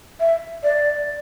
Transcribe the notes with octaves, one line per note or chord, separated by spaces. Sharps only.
E5
D5